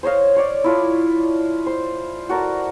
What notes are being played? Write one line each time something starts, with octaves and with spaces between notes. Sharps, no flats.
C5 C#5 D#5 F5
C#5 D5 E6
E4 F4 A4
C5
F#4 A4 A#4 D5